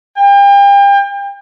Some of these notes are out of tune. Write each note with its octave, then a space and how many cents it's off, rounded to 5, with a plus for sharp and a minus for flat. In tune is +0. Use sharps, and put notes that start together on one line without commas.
G5 +35